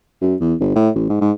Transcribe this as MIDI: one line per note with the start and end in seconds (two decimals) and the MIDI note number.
0.21 0.35 42
0.40 0.55 40
0.60 0.72 31
0.76 0.90 45
0.95 1.05 33
1.09 1.21 44
1.21 1.32 44